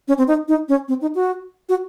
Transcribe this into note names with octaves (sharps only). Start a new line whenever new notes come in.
C#4
C4
D#4
D#4
C#4
C4
D#4
F#4
F#4